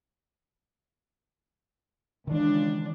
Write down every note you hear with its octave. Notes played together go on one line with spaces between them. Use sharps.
C#2 D#3 E3 D4